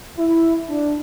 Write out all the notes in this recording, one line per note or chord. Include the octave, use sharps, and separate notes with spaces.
E4
D4